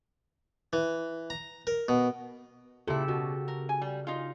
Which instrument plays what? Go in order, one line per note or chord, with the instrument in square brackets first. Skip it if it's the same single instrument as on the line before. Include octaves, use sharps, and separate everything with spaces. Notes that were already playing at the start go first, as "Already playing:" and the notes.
[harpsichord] E3
A#5
A#4
B2
[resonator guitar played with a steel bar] A#2 E4 [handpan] C#3 G4 A4
[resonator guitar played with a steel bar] B2 [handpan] F#4
[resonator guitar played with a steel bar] A#4
G#5
G3
D#4 F4